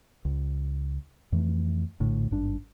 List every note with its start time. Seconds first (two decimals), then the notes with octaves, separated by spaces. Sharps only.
0.25 C#2
1.32 F2 E3 A3
2.00 A#1 A2 D3
2.31 G#1 G2 D4